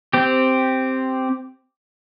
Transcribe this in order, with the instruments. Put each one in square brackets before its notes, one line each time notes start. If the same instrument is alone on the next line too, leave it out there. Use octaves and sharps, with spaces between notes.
[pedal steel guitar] C4 G4